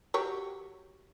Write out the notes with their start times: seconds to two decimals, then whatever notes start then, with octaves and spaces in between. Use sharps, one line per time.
0.14 F#3 G4 C#5